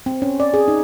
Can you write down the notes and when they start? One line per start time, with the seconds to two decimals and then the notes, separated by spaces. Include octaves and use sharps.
0.06 C4
0.22 C#4
0.40 D5
0.54 G#4
0.68 D#4